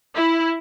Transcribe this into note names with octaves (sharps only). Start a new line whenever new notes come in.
E4